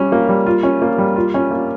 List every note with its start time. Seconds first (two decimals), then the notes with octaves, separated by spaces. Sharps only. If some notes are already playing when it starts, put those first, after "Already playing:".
Already playing: G3 C#4
0.12 A#3
0.29 G3
0.46 F4
0.63 C#4
0.82 A#3
0.98 G3
1.16 F4
1.34 C#4
1.51 A#3